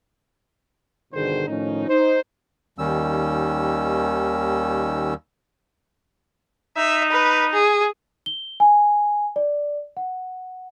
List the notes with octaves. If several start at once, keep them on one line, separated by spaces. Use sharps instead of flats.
G1 B2 D3 D#3 G#4 C5
A2 D#3 F3 C#4 D#4
D#4 C5
D#2 D#3 G3 C#4 E6
D#4 E5
B4
G#4
G7
G#5
D5
F#5